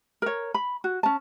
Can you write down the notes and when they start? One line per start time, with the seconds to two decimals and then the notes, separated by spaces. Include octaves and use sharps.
0.22 A#4 C#5
0.54 B5
0.84 F#4
1.03 C#4 A5